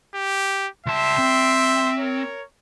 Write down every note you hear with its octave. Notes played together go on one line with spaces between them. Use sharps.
G4
C#2 G3 E5 G5 A5 C6
C4
A#4 C#5